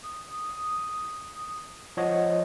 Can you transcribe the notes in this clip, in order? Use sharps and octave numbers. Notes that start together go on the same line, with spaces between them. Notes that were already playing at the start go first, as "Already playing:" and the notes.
D#6
F3 C#5 D#5 F#5